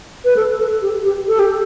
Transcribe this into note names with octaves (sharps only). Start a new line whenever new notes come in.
B4
A4
A4
G4
G4
A4
G4